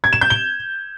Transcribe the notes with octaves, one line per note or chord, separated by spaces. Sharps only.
G#6
E7
G6
G7